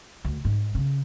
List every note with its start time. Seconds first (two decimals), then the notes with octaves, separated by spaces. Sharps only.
0.25 D2
0.45 G#2
0.75 C#3